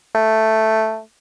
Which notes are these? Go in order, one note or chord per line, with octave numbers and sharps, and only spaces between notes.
A3